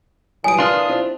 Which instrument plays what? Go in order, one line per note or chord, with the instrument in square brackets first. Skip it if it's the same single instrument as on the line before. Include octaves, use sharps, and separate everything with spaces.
[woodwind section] A#2 E3 D#6 [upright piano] F#3 G3 [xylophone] G#5 D7
[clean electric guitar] D4 F4 [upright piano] F6 F#6
[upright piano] F3 C4 E4